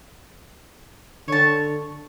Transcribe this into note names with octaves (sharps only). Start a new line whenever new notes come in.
D3 C#5 A5